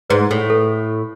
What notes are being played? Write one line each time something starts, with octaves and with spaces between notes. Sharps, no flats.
G#2 B4
A2
A4